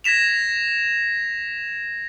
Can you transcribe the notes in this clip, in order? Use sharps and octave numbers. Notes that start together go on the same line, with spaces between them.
G#6 A#6 B6 E7 F7